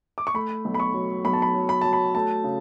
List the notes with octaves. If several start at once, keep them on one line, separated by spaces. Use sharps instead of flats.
D6
C#6
A3 B5
B1
B5
C#6
F#3
B1 B5
A5
B5
F#3
B5
F#3 A5
B5
A3 A5
C#3